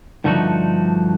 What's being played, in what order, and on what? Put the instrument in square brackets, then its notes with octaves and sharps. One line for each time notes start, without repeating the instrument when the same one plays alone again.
[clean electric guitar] G2 D3 F3 A3 D#4 F#4